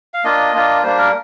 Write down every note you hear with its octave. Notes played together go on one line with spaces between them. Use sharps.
F5
A#3 D4 F4 D#5
A#3 D4 F4
G3 A#3 D4 C5
A#4